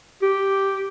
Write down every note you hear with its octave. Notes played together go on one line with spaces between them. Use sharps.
G4